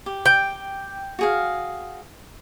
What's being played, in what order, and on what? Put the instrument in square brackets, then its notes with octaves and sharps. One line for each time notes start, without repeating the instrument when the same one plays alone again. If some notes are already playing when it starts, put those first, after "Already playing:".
[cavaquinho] G4
[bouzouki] G5
[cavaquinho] F#4 G#4 F5